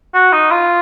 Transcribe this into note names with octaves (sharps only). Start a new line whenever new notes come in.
F#4
D#4
F4